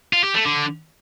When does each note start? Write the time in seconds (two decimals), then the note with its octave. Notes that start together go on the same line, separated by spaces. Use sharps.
0.13 F4
0.24 G4
0.35 A3
0.45 D3